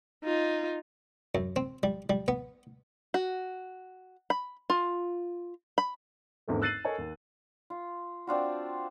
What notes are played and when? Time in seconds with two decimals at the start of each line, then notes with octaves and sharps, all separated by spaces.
0.24 D#4 F4
1.35 F#2
1.56 C4
1.83 G3
2.10 G3
2.28 B3
3.14 F#4
4.30 B5
4.70 F4
5.78 B5
6.48 G#1 E2 D3 A3
6.62 E6 F#6 A6 C7 D#7 F#7
6.85 A4 A#4 C#5 D#5 G#5
6.98 D#2
7.70 F4
8.27 C4 D4 F4 F#4